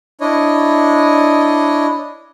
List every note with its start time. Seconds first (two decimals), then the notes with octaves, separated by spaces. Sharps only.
0.21 D4 E4 C#5 D#5